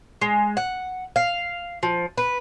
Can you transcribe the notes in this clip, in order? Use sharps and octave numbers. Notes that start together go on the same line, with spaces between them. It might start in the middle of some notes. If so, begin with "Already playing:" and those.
G#3
F#5
F5
F3
B4